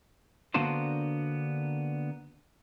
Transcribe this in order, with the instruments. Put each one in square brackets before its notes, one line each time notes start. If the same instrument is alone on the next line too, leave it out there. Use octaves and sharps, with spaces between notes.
[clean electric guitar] D3 A#3 B3 D4 F#4 C5